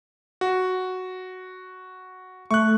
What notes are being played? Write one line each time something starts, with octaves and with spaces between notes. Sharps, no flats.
F#4
A3 C#6 F#6